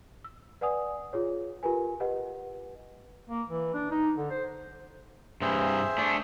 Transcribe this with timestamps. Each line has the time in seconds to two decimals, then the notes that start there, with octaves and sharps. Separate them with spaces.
0.24 E6
0.61 B4 D5 F#5 G#5 D#6
1.13 F4 G#4 C#5
1.63 F4 G4 A#4 B4 G#5
2.00 G4 B4 D#5 F#5
3.30 A#3
3.49 E3
3.74 D4
3.91 D#4
4.17 D3
4.30 C5
5.41 G2 C3 G#4 C5 E5
5.98 A3 D4